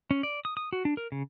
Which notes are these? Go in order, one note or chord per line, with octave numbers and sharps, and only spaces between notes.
C#4
D5
D#6
D#6
F#4
D4
A#4
C#3